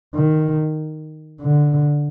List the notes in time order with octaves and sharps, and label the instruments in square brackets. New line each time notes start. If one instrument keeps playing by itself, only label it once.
[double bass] D#3
D3